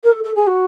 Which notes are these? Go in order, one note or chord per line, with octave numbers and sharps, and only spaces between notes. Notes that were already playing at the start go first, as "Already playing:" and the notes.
A#4
A4
A4
G#4
F#4